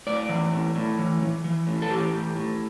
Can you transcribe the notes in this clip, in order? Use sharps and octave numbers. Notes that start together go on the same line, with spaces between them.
A2 D5
E3
A2
A2
E3
E3
E3
A2
A4
E3 G4
A2
A2